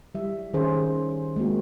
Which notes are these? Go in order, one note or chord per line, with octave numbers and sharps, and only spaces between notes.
G3 E5
D#3 C#4 G#4 C5
G#3 A#3 C4 F#4